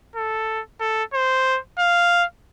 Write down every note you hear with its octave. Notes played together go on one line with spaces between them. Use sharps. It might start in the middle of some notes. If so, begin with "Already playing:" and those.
A4
A4
C5
F5